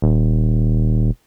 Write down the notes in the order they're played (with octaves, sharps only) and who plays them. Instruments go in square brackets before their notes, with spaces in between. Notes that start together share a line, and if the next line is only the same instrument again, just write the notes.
[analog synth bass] D#1